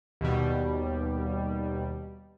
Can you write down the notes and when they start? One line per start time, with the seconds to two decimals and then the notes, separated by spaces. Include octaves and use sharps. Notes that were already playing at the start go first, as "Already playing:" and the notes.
0.21 D#2 B2 G3